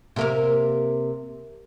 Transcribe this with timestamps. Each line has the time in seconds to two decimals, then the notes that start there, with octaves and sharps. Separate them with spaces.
0.16 C3 A#3 A#4